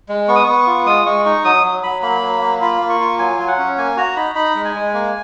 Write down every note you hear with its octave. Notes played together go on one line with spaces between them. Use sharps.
G#3
B3 C#6
D#6
B3 C#6
F4
G#3 D#6
G#3 C#6
D#4 C#6
F#3 D#6
F#3
F#3 B5
A#3 B5
F#3
A#3
F4 B5
A#3
C#6
F4
F#3 G#5
F#3 G#5
F#5
C#4
A#3 G#5
F#4 A#5
D#4 B5
D#4 B5
G#3
G#5
G#3
A#3